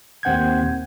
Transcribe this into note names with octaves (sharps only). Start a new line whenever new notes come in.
D#2 C4 F#5 G6 G#6